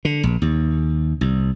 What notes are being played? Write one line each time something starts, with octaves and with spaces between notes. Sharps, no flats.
D3
A#1
D#2
C2